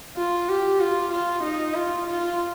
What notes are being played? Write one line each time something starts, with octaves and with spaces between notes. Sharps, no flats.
F4
G4
F4
F4
D#4
F4
F4